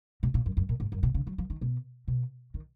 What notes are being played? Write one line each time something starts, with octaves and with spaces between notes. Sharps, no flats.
B2
A#2
F#2
F#2
A#2
G#2
F#2
B2
C#3
F#3
F3
D#3
B2
B2
D#3